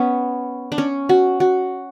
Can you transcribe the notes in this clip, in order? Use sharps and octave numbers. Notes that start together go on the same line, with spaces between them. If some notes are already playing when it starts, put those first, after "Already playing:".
Already playing: B3 C#4
D4
C#4
F#4
F#4